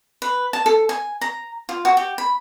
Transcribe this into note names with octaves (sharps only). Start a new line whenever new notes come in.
B4
A5
A4
G#5
A#5
F4
F#4
G4
B5